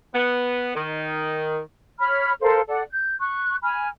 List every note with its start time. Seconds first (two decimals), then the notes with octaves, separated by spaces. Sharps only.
0.14 B3
0.75 D#3
2.00 C#5 B5 F6
2.41 A4 A#4 C5 F5
2.69 A4 D5 F#5
2.90 G6
3.20 C#6 F#6
3.62 G#5 B5 F6